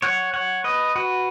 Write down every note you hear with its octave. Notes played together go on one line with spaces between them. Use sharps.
C#5 F#5
C#5 F#5
B4 D#5
F#4 B4